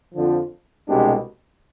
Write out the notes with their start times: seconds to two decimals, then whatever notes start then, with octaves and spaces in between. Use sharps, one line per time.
0.14 F2 D3 F3
0.88 C2 B2 G#3 D4 G4